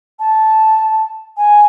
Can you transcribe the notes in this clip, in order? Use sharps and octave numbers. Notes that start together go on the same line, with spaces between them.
A5
G#5